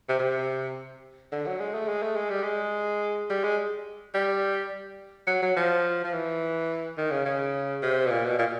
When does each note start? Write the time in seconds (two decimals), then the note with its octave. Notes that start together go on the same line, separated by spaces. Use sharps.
0.09 C3
0.19 C3
1.32 D3
1.46 F#3
1.60 G#3
1.74 A3
1.89 G#3
2.02 A3
2.16 G#3
2.29 G3
2.43 G#3
3.30 G3
3.44 G#3
4.14 G3
5.27 F#3
5.42 F#3
5.56 F3
6.04 F3
6.13 E3
6.98 D#3
7.11 C#3
7.25 C#3
7.82 C3
8.06 B2
8.11 A#2
8.25 B2
8.39 A#2